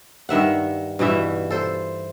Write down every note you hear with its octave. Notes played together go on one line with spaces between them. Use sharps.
G2 D#3 E5 F#5
G2 B2 E3 E5
A4 C5